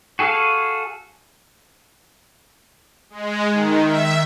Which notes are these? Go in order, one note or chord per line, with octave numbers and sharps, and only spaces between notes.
F#4 G#4 A4 F5
G#3
D#3
E5